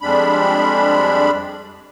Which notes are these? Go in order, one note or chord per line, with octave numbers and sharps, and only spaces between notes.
F2 G3 G#3 D4 B5